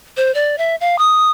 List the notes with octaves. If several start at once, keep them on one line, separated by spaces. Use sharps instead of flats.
C5
D5
E5
F5
D#6